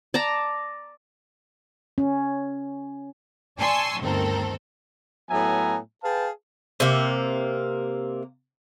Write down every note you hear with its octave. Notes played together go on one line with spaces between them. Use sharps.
D5 A5 A#5
C#4
D5 G#5 A5 C6 C#6 E6
G1 D2 D#3 C4 A4 A#4
A2 F#3 B3 E5 G#5 A#5
G#4 B4 F5 G5 A5
C3 A#3